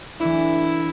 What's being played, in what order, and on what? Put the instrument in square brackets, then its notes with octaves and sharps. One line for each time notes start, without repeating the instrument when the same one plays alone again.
[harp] E3 A3 D4 [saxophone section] E4